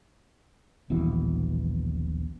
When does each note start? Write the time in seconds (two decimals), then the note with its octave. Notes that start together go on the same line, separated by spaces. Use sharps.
0.90 D#1 A#1 B2 E3